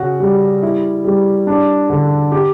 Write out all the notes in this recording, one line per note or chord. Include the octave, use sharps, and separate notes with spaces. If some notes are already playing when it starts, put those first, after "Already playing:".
Already playing: C#3 F#4
G3
E4
G3
D4
D3
G4